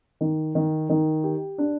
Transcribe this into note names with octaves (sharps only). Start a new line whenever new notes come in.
D#3
D#3
D#3
G4
D4